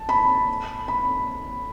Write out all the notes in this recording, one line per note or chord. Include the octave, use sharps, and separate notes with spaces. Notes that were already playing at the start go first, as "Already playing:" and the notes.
Already playing: A5
B5
B5